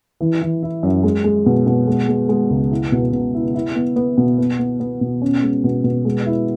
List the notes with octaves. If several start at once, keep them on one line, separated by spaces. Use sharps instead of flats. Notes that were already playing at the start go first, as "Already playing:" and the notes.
E3
E3
E4
F#2
G#3
G#3
B2
B2
G#3
G#3
G#3
C#2
E4
B2
B2
E4
E4
B3
B3
B2
B3
B3
B3
B2
C#4
G#3
B2
B2
G#3
E4